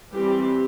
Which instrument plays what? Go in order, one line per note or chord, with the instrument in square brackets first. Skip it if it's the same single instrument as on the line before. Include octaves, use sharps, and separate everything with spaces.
[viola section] E3 G3 C4 G4